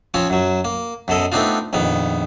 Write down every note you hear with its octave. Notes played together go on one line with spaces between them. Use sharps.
F3 C4 C#4 F4
F#2 F#3
A#3
F#2 B2 A4 D#5
A3 B3 C4 D4 D#4 F4
A#1 F2 D#3 B3